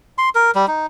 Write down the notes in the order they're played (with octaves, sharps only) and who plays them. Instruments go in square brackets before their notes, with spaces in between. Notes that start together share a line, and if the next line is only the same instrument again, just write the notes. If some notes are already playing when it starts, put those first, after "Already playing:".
[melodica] C6
A#4
G3
D#4